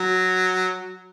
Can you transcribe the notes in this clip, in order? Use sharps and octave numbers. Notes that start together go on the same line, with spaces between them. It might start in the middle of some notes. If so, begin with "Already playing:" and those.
Already playing: F#3